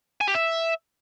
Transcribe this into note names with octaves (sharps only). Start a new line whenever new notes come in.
G#5
G4
E5